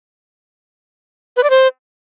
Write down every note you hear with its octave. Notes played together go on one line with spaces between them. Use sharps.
B4
D5
C5